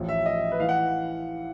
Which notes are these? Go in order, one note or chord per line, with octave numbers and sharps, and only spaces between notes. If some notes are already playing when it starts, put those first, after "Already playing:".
Already playing: A1 A2 F3
E5
D#5
B4
E3 F5
F#5